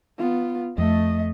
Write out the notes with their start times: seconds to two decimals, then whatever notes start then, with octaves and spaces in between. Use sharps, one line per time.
0.18 B3 F4
0.78 F2 A3 D#5